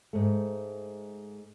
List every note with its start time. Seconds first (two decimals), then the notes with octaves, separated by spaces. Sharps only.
0.13 G#2 A3